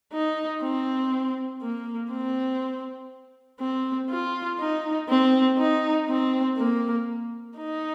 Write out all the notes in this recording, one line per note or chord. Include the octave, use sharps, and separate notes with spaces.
D#4
C4
A#3
C4
C4
F4
D#4
C4
D#4
C4
A#3
D#4